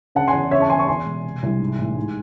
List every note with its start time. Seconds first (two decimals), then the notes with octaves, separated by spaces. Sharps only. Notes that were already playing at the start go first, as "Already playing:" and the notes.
0.15 C#3 F#5 A5
0.28 G#5 C6
0.33 E2
0.51 C#3 C#5 E5
0.60 A5 C#6
0.69 E2 G#5 C6
0.79 A5 C#6
0.88 E2 G#5 C6
1.06 E1
1.24 C3
1.43 C2
1.60 G#2
1.78 A1
1.96 G#2